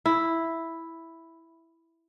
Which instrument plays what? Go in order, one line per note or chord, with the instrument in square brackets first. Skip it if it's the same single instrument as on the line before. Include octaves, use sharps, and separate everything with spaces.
[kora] E4